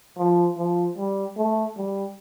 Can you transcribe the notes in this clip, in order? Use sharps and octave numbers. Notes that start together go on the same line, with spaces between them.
F3
F3
G3
A3
G3